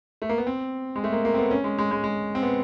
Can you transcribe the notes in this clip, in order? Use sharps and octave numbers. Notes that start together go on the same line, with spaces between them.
A3
A#3
B3
C4
G#3
A3
A#3
A#3
C4
B3
C#4
G#3
G#3
G#3
G#3
C4
B3